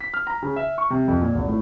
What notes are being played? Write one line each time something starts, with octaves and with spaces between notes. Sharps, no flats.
B6
F6
A#5
C#3
E5
C#6
C3
F2
A#2
G#1
A2